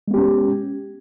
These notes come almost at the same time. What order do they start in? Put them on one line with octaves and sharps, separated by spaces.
G#3 B3 G4 C#4